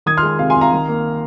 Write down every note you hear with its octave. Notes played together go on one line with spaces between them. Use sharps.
D#3 D#6 G#6
C6 F6
G#3
C3 F5
G#5 C6
C2
F5 A#5
D#3
A#3